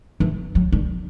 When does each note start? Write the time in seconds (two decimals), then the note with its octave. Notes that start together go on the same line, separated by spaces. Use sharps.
0.20 E3
0.55 F#3
0.72 G3